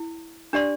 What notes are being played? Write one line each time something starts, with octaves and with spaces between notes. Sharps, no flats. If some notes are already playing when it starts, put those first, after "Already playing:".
Already playing: E4
D4 G4 D5 C6